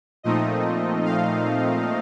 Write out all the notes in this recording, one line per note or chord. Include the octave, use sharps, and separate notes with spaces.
A#2 F3 A3 C4 D#4 D#5
F5